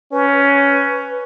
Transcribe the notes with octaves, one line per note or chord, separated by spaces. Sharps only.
C#4 B4